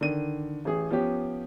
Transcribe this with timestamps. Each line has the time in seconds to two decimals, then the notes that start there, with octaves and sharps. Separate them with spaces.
0.01 D3 D#3 D#7
0.65 A1 G#4
0.90 F3 B3 C#4 G4